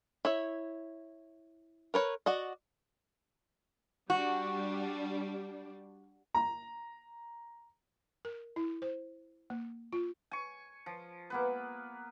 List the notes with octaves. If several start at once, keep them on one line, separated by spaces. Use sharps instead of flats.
E4 C#5 E5
A#4 B4 C#5
F#4 D5 D#5
G3 D4 F#4
A#5
A#4
E4
C5
A#3
F4
G#5 C#6
F3
A#3 B3 B4